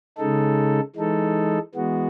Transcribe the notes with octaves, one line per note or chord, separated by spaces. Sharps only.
C#3 G#3 D#4 A4
E3 G#3 D#4 A4
E3 G#3 B3 F#4